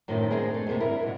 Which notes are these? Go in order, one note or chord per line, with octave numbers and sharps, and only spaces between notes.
F#2 A2 C3 D#3 F3
G#3 C4 D4 G#4 A#4
A3
D#2 A2 C3
G2 E4 A#4
G#2 B2